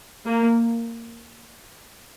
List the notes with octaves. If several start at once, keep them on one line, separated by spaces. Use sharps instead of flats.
A#3